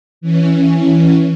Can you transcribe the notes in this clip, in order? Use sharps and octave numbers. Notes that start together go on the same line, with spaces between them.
E3 C#4